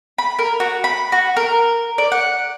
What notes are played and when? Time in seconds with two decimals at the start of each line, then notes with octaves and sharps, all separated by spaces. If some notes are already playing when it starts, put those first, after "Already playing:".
0.18 B5
0.39 A#4
0.60 F#4
0.84 B5
1.12 F#4
1.37 A#4
1.98 D5
2.12 F#5